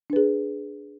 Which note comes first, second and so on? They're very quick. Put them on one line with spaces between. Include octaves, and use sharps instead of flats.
D4 B4 G#4